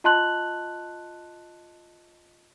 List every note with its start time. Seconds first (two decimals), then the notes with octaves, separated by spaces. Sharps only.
0.04 F4 D#5 A5 C6 F#6 F#7